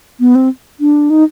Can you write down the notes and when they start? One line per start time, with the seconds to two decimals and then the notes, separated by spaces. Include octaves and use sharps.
0.20 B3
0.35 C4
0.80 D4
1.10 D#4